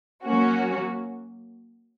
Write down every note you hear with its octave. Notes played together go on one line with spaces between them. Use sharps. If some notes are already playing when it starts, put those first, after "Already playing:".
F#3 A#3 C#4 F#4